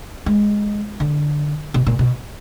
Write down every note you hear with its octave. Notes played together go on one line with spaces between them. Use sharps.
G#3
D3
B2
A#2
B2